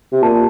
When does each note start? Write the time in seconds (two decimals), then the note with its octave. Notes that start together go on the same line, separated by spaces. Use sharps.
0.12 C3
0.22 A#2 A5